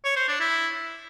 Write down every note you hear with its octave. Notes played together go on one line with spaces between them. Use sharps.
C#5
C5
D4
E4